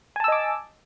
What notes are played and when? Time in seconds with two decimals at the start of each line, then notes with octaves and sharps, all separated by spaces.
0.16 G#5
0.20 A5
0.24 E6
0.28 D#5
0.32 D6